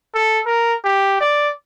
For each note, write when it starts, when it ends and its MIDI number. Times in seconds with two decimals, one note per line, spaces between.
0.15 0.40 69
0.46 0.74 70
0.85 1.17 67
1.21 1.51 74